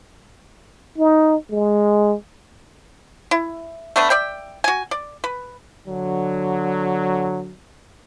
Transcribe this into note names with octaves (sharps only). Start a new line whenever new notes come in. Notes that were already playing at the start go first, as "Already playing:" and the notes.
D#4
G#3
E4
A3 B3 D4 B4
D5 E5 G5
F#4 G#5
D5
B4
D3 F#3